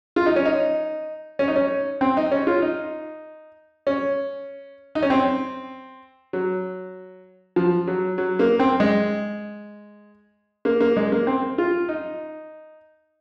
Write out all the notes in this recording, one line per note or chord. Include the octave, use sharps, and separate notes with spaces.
F4
D#4
C#4
D#4
C#4
D#4
C#4
C4
D#4
C#4
F4
D#4
C#4
D#4
C#4
C4
F#3
F3
F#3
F#3
A#3
C4
G#3
A#3
A#3
G#3
A#3
C4
F4
D#4